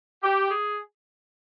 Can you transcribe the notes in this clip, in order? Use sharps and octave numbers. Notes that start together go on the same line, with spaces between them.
G4
G#4